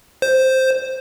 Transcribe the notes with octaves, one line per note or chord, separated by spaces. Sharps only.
C5